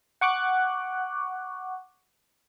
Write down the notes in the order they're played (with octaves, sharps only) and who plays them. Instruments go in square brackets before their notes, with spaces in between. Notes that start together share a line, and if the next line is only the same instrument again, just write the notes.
[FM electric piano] F#5 C#6 D6 F#6